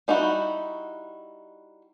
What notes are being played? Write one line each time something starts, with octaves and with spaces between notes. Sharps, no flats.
G3 D#4 E4 F#4